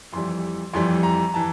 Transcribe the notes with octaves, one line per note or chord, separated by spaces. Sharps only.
F2 E3 G3 C6
F2 E3 G3 C6
A#5
E3 A5